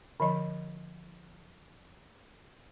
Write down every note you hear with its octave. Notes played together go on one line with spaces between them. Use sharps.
D3 F3 D#5